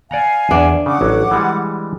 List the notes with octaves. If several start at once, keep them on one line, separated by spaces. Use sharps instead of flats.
D5 F5 F#5 G#5 A#5
E2 D4
C#3 F#5 D6
A1 F#3
E3 G3 G#3